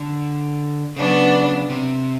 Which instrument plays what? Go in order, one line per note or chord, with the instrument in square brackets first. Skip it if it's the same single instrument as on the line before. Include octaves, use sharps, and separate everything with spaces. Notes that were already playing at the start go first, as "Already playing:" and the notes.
Already playing: [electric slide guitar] D3
[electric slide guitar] C#3 [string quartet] F#3 B3 D4
[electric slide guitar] C3